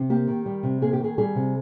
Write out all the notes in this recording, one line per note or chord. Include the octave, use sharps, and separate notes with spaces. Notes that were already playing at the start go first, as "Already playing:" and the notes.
Already playing: C3
A#3 G4
D#3
G3
C3
A#3 G#4
G4
D#3 G#4
G3 G#4
C3